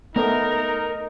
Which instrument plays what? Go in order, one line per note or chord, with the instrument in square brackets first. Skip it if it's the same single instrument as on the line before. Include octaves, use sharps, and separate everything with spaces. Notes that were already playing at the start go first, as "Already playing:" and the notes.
[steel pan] A3 B3 [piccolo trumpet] D#4 [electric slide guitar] A#4